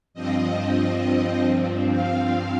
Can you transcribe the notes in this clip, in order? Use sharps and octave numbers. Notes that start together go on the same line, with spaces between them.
G2 F3 C4 D#5
F5